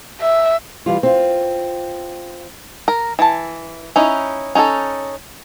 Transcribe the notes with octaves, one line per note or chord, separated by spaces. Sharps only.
E5
E3 G3 F4
C4 F4
A#4
E3 A5
C#4 D#4 E4
C#4 D#4 E4 A4